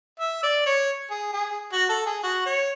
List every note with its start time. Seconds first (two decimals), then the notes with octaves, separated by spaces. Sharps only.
0.20 E5
0.43 D5
0.66 C#5
1.11 G#4
1.33 G#4
1.73 F#4
1.89 A4
2.06 G#4
2.23 F#4
2.46 C#5